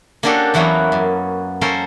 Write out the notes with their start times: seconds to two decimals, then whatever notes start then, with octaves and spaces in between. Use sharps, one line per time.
0.23 A#3 C#4 D4 F#4 G4 A4
0.54 E2 E3 F#3 A#3 B3 C#4
0.92 F#2
1.61 A#3 C#4 A4 A#4 C5